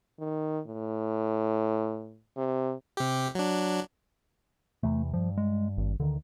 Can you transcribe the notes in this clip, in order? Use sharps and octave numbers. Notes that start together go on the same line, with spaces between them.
D#3
A2
C3
C3 G4
F#3 D4
E2 C3 E3 A3
G2 F3
G#3
G#1
D2 D3 D#3